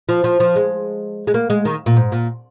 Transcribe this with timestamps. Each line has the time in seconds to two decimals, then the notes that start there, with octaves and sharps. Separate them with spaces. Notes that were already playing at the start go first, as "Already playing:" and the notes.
0.09 F3
0.24 F3
0.40 F3
0.56 G#3
1.27 G#3
1.34 A#3
1.50 G#3
1.65 D#3
1.86 A#2
1.96 G#2
2.12 A#2